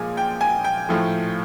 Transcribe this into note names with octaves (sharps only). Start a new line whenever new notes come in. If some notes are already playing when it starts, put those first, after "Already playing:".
Already playing: A#2 F3 G#3 G#5
G5
G#5
G5
A2 F3 A3